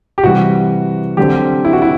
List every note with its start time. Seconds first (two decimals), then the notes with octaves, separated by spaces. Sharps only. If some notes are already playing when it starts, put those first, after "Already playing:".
0.18 G4
0.23 C3 E3 G3 F#4
1.17 D3 F#3 C4 G4
1.65 E4
1.73 F#4
1.82 E4